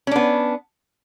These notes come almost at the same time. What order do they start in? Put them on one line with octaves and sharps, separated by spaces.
C#4 D4 B3